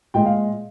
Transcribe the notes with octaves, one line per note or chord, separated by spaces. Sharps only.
A#2 G#3 G5
F5